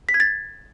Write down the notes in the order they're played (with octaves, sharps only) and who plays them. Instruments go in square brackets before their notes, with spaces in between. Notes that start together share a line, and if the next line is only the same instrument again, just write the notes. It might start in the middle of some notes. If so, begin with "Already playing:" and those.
[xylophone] B6
G#6
A6